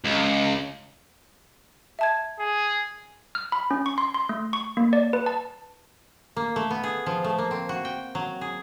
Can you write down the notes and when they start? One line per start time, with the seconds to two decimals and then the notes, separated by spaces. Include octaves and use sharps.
0.04 C#2
1.99 E5 A5 G#6
2.40 G#4
3.35 F6
3.52 B5
3.71 C#4
3.86 C#6
3.98 C6
4.14 C6
4.29 A3
4.53 C#6
4.77 A#3
4.93 D5
5.13 B4
5.26 A5
6.36 A#3
6.56 A3
6.70 B3
6.83 G#4
7.06 F3
7.24 A3
7.38 A#3
7.51 C4
7.69 F#4
7.85 G5
8.15 F#3
8.41 G#4